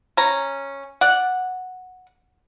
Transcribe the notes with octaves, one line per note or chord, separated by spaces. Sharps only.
C#4 A#5
D5 F#5